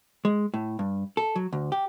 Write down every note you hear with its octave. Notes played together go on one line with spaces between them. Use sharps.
G#3
A2
G2
A4
F#3
D2
G4